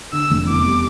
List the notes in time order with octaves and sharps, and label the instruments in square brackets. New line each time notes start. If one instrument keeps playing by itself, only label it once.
[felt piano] D3 [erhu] E6
[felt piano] F1
[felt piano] E2 [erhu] D6
[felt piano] G3